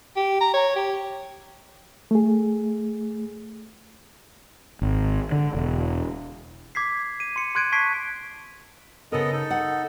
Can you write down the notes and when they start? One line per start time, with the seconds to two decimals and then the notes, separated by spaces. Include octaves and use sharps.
0.16 G4
0.41 A#5
0.54 C#5
0.76 G4
2.11 A3 G#4
4.82 G#1
5.32 D3
5.54 E1
6.75 D6 G#6 B6 C7
7.20 D#7
7.36 C6 C#7
7.55 C6 F#6 G#6 D7 D#7
7.72 A5 C#6 G#6 B6 C7 D7
9.12 C#3 B3 A4 A#4 D#5
9.33 D#4 A4
9.50 F#5